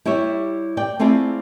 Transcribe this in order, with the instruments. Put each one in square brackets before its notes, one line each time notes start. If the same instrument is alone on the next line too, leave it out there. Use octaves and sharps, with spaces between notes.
[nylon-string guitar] G3 E4 G4 C#5 E5
D5 G5
A3 C4 E4 F4 G#4 D5